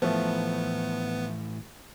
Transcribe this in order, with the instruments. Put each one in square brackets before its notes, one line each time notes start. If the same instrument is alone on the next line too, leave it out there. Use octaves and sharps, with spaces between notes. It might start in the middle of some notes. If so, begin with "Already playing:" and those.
[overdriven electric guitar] A2 E3 [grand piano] F3 A3 [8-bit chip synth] B3